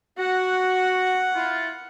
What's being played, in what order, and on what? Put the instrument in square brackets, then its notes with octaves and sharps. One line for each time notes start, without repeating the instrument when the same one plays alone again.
[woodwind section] F#4 [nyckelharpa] F#5
[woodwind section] E4 F4